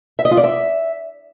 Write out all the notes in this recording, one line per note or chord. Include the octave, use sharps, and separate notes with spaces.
E5
D#5
F4
D5
E5